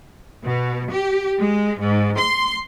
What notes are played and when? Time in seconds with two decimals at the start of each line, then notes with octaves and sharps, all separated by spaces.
0.44 B2
0.90 G4
1.39 G#3
1.79 G#2
2.19 C6